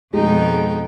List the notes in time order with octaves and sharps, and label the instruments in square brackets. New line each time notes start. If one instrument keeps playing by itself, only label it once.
[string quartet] F2 B2 [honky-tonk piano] G#3 [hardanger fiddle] D#4 G5